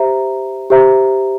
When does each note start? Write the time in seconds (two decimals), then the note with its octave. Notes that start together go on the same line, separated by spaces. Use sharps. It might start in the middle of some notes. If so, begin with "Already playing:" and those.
Already playing: G4 C5 E5 A#5
0.70 G4 C5 E5 A#5